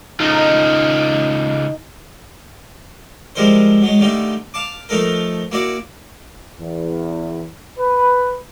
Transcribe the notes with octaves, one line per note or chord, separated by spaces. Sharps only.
C#3 D#4 F4 A4
F3 G3 G#3 E4 A#4 C5
F#3 G#3
D3 D#3 G3 A3 D#4
F5 A5 D6
F3 A3 D#4 A4 A#4
A#3 E4 F#4 D5
E2
B4